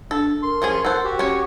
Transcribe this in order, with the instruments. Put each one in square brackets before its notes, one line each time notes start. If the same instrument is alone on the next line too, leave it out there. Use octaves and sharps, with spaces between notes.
[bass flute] D4 [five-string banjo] A4
[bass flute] A#4 [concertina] C6
[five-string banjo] F3 C#4 G#4
[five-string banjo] A4 C5 [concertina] F#5
[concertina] F#4 G4
[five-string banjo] C#4 C#5